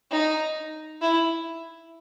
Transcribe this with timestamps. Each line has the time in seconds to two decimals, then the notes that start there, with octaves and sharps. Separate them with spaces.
0.11 D#4
1.02 E4